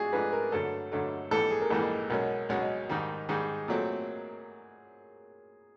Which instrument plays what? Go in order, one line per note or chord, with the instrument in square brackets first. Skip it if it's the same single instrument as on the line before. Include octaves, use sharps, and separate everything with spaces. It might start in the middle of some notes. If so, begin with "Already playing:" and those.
Already playing: [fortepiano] G#2 F3 A3 D4 [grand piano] F#4 G#4
[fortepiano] G#2 F3 A3 D4 [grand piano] B4
[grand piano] A#4
[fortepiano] G2 D3 F#3 A3 [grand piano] A4
[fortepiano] G2 D3 F#3 A3
[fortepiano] A#1 G#2 E3 G3 [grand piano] A4
[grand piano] G#4
A#4
[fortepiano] A#1 G#2 E3 G3 [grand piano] A4
[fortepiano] B1 B2 G#3 C#4 [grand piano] A#4
[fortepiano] B1 B2 G#3 C#4
G#2 D#3 G3
[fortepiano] G#2 D#3 G3 [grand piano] G#4
[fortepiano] A#2 F#3 A3 C4